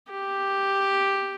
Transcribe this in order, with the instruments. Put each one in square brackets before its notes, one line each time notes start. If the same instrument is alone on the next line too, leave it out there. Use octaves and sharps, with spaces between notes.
[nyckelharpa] G4